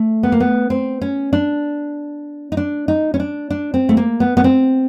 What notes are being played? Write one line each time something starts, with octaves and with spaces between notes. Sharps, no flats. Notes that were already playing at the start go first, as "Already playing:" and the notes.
Already playing: A3
B3
A#3
B3
C4
C#4
D4
D#4
D4
D#4
C#4
D4
D4
C4
A3
A#3
B3
B3
C4